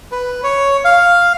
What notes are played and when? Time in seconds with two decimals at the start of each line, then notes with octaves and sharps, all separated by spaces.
0.12 B4
0.43 C#5
0.85 F5